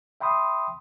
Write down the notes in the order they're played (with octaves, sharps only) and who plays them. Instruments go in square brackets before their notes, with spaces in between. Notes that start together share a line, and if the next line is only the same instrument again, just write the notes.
[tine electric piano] E5 G5 B5 C6 D#6